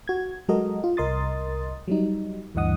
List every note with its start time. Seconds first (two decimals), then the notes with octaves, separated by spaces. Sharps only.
0.08 F#4 G#6
0.49 F#3 G#3 F#4 A4 A#4 D#5
0.84 F4
0.97 C2 A#4 D#5 C6 D#6 A6
1.88 F#3 G3 D#4
2.55 D2 G2 E3 D#5 F#5 D#6